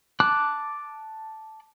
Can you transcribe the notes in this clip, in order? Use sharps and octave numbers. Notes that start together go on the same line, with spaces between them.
A5 D6 F#6